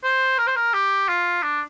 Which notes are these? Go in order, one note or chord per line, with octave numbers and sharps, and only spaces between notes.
C5
A#4
C5
A#4
G4
F4
D4